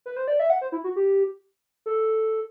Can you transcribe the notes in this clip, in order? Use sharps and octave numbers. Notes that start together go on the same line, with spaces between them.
B4
C5
D5
E5
F#5
C5
E4
F#4
G4
A4